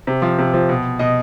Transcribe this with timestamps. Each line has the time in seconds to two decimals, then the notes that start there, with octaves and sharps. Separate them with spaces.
0.07 C3
0.22 F3
0.39 C3
0.53 F3
0.69 B2
0.99 B2 D#5